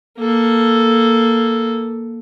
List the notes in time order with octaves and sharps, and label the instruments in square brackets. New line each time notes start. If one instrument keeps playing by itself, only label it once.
[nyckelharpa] A#3 A4